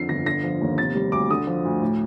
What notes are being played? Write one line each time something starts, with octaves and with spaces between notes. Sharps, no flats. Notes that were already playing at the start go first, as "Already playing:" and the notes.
Already playing: F2 D3 C7
G1 A#6
D3 A#6
F3
D#2
C3 A6
G3
D2 D6
D3 D#6
F3
D2
A2